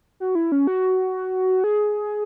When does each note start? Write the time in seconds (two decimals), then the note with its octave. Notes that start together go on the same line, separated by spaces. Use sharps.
0.20 F#4
0.35 E4
0.52 C#4
0.67 F#4
1.64 G#4